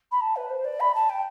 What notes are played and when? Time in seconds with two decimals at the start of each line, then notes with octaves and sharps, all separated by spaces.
0.11 B5
0.21 A5
0.36 B4
0.49 C5
0.64 D5
0.80 B5
0.94 A5
1.09 G5